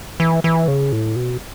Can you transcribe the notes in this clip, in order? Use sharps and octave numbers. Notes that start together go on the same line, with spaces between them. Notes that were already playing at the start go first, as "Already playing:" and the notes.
E3
E3
C#3
A2
B2